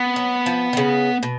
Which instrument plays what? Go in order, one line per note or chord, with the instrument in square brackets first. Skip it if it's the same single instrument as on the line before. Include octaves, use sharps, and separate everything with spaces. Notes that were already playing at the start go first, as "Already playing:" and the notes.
Already playing: [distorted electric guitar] B3
[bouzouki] F#3
F3
D#3
C#3
B2